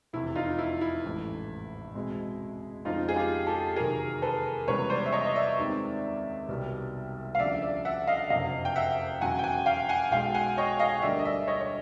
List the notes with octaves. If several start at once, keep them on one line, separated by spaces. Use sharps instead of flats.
F1 E2 C3 E4
D#4 F4
E4
E4
A1 G#2 E3 A3
E2 B2 G#3 C4
F2 C#3 F3 G#3 D#4 F4
G#4
F4 G4
G4 A4
E2 C3 D#3 F#3 A#3 G#4 A#4
A4 B4
C#2 C3 E3 G3 B3 B4 C#5
C5 D5
E5
C#5 D#5
D#5
D5 E5
D#2 D#3 G#3 C4
C2 B2 G3 B3
F5
D2 C#3 F3 D5 E5
D5 E5
E5 F#5
D#5 F5
F#1 F2 C3 D#5 F5
G5
E5 F#5
E1 E2 C#3 F#3 F#5 G#5
G5
F#5 G#5
F5 G5
F#5 G#5
B1 B2 G#3 F5 G5
F#5 G#5
C#5 D#5
D#5 F5
D2 D3 G3 A#3 D5 E5
D#5
D5 E5
C#5 D#5
C#5